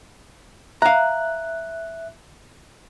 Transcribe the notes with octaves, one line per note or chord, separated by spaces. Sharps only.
E5 F5 A#5 F#6